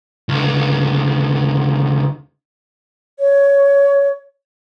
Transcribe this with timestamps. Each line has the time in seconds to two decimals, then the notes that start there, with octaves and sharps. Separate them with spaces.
0.29 C#2 D3
3.20 C#5